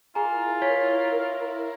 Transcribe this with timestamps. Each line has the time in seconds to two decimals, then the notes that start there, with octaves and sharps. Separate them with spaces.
0.15 E4 F4 G#4 A#4 G#5 A#5
0.62 C#5 B6